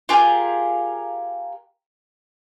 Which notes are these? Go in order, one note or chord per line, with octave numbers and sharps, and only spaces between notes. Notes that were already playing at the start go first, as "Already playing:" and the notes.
F4 G4 G#4 A#4